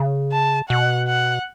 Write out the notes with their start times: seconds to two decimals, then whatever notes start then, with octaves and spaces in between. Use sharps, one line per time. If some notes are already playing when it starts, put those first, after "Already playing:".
Already playing: C#3
0.32 A5
0.69 B2 F#5
1.08 F#5